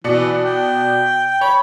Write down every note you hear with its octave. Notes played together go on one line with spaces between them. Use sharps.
B2 E3 D5 C#7
G5
C#5 B5